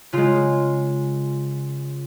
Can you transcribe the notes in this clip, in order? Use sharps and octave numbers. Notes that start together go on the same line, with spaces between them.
C#3 G#3 F4